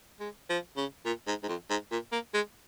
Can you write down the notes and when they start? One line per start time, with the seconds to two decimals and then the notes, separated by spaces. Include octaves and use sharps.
0.20 G#3
0.50 F3
0.77 C#3
1.06 A#2
1.27 G#2
1.43 G#2
1.49 F2
1.70 G#2
1.92 A#2
2.12 A#3
2.34 G#3